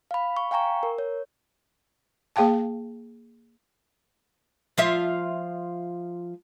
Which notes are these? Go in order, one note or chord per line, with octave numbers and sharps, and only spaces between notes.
F5 B5
C#6
F5 G5 G#5 A#5 C#6
A#4
C#5
A#3 G#4 F5 G5 A5
F3 F4 E5